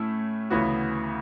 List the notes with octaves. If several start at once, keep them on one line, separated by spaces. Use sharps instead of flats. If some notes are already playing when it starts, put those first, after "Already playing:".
Already playing: A2 A3 C#4 E4
D2 C#3 E3 B3 F#4